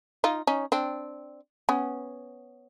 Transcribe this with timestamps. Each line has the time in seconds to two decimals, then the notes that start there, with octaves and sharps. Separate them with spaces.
0.24 D#4 F4
0.47 C#4 D#4
0.72 C4 D4
1.69 B3 C#4